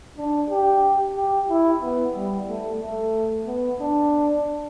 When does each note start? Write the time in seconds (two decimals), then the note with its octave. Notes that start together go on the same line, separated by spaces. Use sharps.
0.18 D4
0.50 G4
1.16 G4
1.49 E4
1.82 B3
2.15 G3
2.48 A3
2.81 A3
3.47 B3
3.80 D4